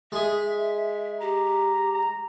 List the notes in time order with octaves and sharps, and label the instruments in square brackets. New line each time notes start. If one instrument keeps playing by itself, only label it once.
[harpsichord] G#3 G#4 [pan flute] E5
[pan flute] G4 [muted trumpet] A#5
[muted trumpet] A#5